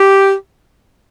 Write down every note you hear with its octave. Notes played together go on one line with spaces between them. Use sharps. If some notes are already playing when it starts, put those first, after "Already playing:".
Already playing: G4